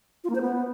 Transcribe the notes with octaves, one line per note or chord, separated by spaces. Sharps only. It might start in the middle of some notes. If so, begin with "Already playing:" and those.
F4
A#3
C5
B3